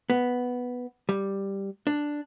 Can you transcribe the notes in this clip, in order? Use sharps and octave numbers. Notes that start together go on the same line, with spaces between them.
B3
G3
D4